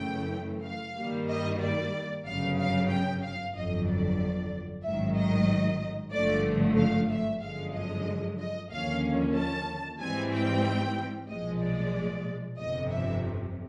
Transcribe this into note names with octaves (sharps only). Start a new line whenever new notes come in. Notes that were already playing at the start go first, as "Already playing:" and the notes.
Already playing: F#2 C#3 E3 A3 G5
F5
G2 D#3 G3 A#3
D#5
D5
G1 F#2 C#3 F5
F5
G5
F5
G1 F2 D3 F#3 D#5
D5
A1 G#2 D#3 F#3 E5
D#5
G#1 G2 D3 F3 A3 D5
F5
E5
G1 F#2 D3 F3 G#3 F5
D#5
D#5
D#2 D3 F3 A#3 C#4 F5
A5
G#2 E3 G3 C4 G#5
G5
B1 A#2 F3 G#3 D#5
D5
G1 F2 C3 D#5
E5